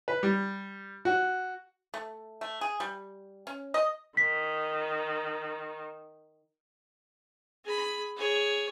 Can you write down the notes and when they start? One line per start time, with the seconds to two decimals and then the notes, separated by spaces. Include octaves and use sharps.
0.08 B4
0.23 G3
1.05 F#4
1.94 A3
2.41 A3
2.61 G#4
2.80 G3
3.47 C#4
3.74 D#5
4.17 D#3 B6
7.65 G#4 B5
8.16 G#4 C#5